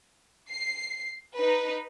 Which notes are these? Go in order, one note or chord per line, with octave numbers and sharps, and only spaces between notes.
C7
D#4 B4